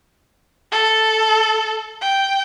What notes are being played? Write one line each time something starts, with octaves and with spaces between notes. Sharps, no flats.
A4
G5